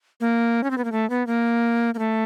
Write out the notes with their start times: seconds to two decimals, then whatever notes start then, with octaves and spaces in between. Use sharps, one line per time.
0.20 A#3
0.64 C#4
0.71 C4
0.78 B3
0.84 A#3
0.92 A3
1.10 B3
1.27 A#3
1.94 A#3
1.99 A3